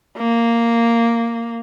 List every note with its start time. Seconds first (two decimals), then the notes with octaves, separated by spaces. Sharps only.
0.18 A#3